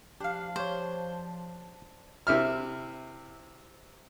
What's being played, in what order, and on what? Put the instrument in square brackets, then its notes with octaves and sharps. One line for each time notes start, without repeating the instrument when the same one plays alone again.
[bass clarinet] F3 [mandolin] D4 F5 [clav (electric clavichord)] G4
[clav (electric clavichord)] G4 C#5 [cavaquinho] C5
[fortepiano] C3 E4 E5 F6